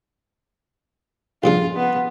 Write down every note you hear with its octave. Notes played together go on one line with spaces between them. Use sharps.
A#1 G2 C#3 F4
B3